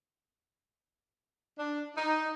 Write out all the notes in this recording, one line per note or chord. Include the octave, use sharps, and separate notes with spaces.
D4
D#4